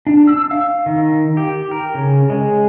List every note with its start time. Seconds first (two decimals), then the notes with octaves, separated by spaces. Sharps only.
0.07 D4
0.27 E6
0.51 F5
0.86 D#3
1.37 G4
1.71 A#4
1.94 C#3
2.30 G#3